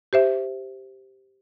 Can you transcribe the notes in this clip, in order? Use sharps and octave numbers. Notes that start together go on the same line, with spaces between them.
G4 C5 E5